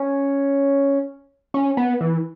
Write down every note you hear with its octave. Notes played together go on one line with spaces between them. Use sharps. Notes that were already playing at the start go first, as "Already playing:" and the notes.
Already playing: C#4
C#4
B3
E3